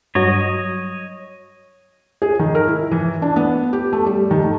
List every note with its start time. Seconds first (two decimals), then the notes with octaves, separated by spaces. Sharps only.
0.15 G2 F#3 C#5 D#5
2.22 G#4
2.39 D#3
2.55 A#4
2.68 E4
2.91 E3
3.22 D4
3.36 B3
3.73 G4
3.93 A3
4.06 G3
4.31 D#3
4.44 A3